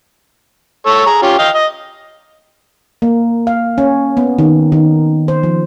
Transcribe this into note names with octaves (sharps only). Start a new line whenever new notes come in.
A4 C#5 E6
G#4 A#5
C#4 F4 G4
D#5 F5 G5
D#5
A#3
F5
C#4
B3
D#3
D#3
C5
F3